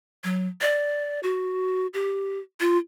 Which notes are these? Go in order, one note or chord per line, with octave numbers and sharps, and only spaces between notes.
F#3
D5
F#4
G4
F4